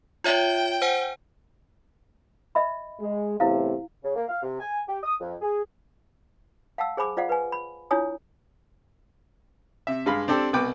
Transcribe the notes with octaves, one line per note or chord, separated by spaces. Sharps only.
F4 C#5 E5 G5
C5 F#5 G#5
D#5 E5 B5
G#3
E2 A2 C3 E4 F5
C#3
A#3
F5
C3
G#5
G4
D#6
F2
G#4
F5 F#5 A5 E6
G#4 C5 G#5 B5 D6
F4 C5 D5 F5 F#5
B4 G#5
B5
D4 E4 F4 C#5 G#5 D#6
C3 E5
G2 G#3 F5 B5
C4 D4 G4 A4 D5
C2 B2 B4 G5 D6